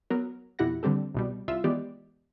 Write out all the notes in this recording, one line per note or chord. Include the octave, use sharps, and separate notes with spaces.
F#3 B3 A#4
F2 B2 E4 G4 F#5 A#6
D3 G3 C4 G4 A4
C2 B2 G3
C2 F4 E5 E6
E3 G#3 B3 G4 D5